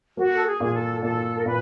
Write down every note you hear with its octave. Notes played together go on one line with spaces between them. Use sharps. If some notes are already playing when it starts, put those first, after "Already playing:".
A#3 F#4
A4
G#4
A#2 G#4
A4
A#2 A4
A#4
A#2 B4